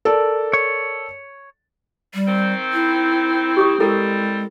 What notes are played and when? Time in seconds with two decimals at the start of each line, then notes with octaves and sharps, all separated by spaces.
0.05 A4 A#4 D5
0.53 C#5
2.14 G3
2.28 D#3 C4
2.73 E4
3.57 G4 C#6 D#6
3.80 G3 G#3 C4 E4 A4 A#4